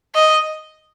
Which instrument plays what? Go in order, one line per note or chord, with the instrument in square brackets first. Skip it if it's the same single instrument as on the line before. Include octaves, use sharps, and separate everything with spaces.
[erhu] D#5